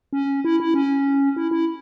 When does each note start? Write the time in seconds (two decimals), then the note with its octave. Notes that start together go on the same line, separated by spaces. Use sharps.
0.13 C#4
0.45 E4
0.60 E4
0.74 C#4
1.36 E4
1.51 E4